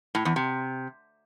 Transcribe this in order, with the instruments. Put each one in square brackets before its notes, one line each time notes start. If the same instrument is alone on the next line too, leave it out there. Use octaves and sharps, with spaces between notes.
[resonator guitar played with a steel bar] A2
E2
C3